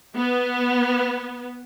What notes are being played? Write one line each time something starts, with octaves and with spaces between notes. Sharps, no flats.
B3